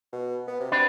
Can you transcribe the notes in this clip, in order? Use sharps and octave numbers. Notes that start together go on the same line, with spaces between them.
B2
B3
C3
C4 D4 B4